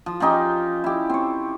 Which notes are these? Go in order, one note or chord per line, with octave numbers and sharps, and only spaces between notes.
F3
F3 C#4 D#4 G4
E4 G4
C4 C#5